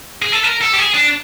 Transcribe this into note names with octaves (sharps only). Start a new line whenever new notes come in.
G#4
A4
A#4
A4
G4
G#4
D4